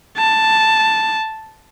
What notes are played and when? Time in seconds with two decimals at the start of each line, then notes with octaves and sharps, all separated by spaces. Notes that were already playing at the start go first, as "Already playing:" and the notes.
0.17 A5